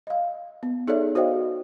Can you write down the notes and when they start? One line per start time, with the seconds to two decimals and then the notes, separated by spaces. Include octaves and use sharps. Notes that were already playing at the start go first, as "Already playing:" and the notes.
0.07 D#5 F5
0.63 B3
0.88 D#4 G#4 A4 C#5 D5 E5
1.15 F#4 C5 D5 D#5 F5 G5